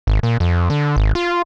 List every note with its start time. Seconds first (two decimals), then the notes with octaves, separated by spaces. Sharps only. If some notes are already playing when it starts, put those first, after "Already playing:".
0.07 G#1
0.23 A#2
0.40 F2
0.70 D3
0.96 G#1
1.15 F4